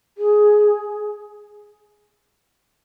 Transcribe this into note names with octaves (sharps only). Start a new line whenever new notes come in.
G#4